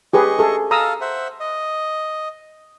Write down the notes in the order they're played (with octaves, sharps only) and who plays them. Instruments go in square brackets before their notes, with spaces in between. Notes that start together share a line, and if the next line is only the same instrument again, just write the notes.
[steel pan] G4 G#4 B4 [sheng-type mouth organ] D#5 C#6
[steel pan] G#4 A4
[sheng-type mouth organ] A4 F5 [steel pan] A#5 D#6 E6
[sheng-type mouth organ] C5 E5 F#5
D#5